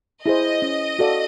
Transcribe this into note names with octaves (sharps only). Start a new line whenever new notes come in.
E4 G#4 C5 D#5
C#4
F#4 A4 D5 F5